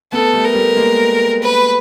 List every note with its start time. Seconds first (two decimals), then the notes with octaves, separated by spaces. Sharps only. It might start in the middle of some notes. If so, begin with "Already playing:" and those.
0.12 A3 B3 A4
0.33 G3 A3
0.45 A#4
0.55 G3 A3
0.77 G#3 A#3
1.42 B4